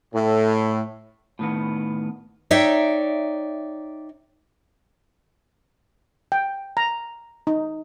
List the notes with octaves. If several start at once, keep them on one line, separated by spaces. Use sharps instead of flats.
A2
A2 D#3 B3
D#4 C#5 D5 E5 G5
G5
A#5
D#4